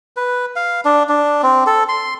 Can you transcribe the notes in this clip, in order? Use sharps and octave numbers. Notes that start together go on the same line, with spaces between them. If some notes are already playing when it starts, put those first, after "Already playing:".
B4
F5
D4
D4
C4
A4
C6